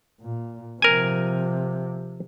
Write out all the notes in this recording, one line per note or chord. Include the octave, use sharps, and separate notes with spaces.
A#2
C3 F3 A#4 G#5